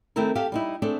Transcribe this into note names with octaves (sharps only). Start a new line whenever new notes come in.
D#3 G3 A3 C4 E4 A#4
G4 A4 E5 F5
G3 D#4 E4
A3 C4 D4 G#4 A4